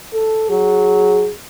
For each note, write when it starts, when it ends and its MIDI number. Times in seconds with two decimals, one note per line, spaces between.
0.13 0.46 69
0.50 1.30 54
0.50 1.32 68